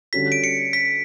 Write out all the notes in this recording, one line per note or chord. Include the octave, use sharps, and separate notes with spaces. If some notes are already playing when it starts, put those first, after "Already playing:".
D3 G3 C#4 F#4 A4 B6
D7
C#7
B6